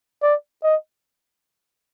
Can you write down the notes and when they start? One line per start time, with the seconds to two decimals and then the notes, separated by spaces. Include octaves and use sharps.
0.22 D5
0.63 D#5